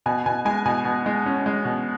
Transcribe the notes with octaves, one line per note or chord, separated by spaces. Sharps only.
B2 G#5
B2 G#5
G#3 G#5
B2 G#5
B2
G#3
C#4
G#3
B2